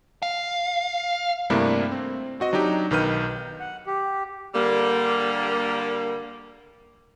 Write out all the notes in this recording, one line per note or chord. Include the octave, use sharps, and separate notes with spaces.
F5
G2 C3 A3 A#3 D4 E4
C4
C4 F#4 D#5
F#3 D4 D#4 G4
B1 D#3 B4 F6 G6 D#7
F#5
G4
D3 G3 A#3